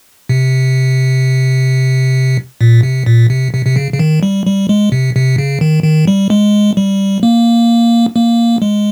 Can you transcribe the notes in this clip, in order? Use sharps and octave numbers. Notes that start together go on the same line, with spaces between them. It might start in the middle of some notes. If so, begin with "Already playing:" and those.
C3
A#2
C3
A#2
C3
C3
C3
C#3
C#3
D#3
G3
G3
G#3
C3
C3
C#3
D#3
D#3
G3
G#3
G3
A#3
A#3
G#3